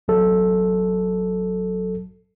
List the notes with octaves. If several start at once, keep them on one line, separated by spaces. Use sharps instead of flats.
A1 F#3 A4